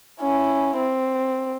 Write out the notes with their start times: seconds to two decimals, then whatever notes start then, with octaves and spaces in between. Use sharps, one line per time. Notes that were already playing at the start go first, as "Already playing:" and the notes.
0.21 C#4 E4
0.78 C4